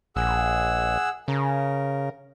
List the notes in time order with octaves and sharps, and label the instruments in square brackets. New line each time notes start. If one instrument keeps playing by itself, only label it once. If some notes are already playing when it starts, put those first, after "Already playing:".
[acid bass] A#1 [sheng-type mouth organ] G#4 F#5 E6
[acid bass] C#3 [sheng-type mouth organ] A#4